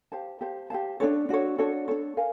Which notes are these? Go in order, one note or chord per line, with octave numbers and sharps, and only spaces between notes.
G4 C5 F5 A5
G4 C5 F5 A5
G4 C5 F5 A5
D4 F#4 A4 C#5
D4 F#4 A4 C#5
D4 F#4 A4 C#5
D4 F#4 A4 C#5
A#4 F5 G#5